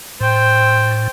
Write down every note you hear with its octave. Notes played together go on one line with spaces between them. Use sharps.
A2 C5 G5